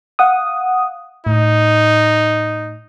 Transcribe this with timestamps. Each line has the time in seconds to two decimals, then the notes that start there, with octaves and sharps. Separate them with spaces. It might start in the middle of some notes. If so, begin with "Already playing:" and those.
0.19 F5 F#5 D#6
1.26 A2 D#4